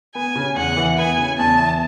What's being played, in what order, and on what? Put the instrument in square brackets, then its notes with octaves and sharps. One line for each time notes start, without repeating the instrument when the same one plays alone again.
[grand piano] B3 [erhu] G#5
[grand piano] C#3
[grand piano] E2 [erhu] F#5
[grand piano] E3
[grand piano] B3 [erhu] G#5
[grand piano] C#3
[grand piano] E2 [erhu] A5
[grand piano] E3